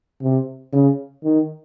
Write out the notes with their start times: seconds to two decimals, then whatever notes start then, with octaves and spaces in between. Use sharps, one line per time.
0.22 C3
0.72 C#3
1.23 D#3